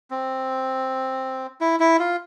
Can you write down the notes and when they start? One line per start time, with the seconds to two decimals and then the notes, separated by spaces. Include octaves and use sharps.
0.11 C4
1.61 E4
1.80 E4
1.99 F4